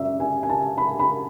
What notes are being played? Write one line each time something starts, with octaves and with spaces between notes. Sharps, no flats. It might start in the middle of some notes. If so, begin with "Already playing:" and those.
Already playing: F#2 D5 E5
G#5
G#5
A5
B5
B5